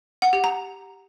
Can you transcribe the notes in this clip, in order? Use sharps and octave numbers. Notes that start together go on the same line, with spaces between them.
F#5
G4
A#5